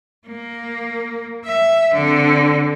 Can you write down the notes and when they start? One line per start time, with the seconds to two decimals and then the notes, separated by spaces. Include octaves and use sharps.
0.28 A#3
1.44 E5
1.94 D3 C4